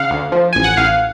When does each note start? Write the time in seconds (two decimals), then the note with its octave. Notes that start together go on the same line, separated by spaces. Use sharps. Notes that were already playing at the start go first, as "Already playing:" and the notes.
Already playing: C#3 F5 F#5
0.10 D2
0.32 F3
0.53 A1 G#5
0.64 F#5
0.77 A1 F5